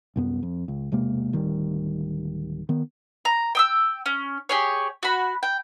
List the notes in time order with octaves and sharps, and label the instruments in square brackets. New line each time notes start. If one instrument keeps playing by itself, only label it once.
[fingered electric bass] C2 F#2 B3
F2
C#2
E1 C3 G#3 A#3
D1 D#3 G3
D#3 B3
[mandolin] A#5
G5 D#6 E6
C#4
G4 G#4 C#5
F#4 B5
G5